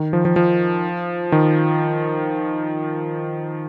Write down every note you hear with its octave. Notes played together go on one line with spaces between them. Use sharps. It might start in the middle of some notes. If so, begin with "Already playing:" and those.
Already playing: D#3
F3
F3
F3
D#3